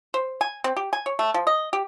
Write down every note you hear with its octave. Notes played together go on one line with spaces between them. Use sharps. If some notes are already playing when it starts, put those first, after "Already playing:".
C5
G#5
C4
G4
G#5
C#5
A3
F3
D#5
G4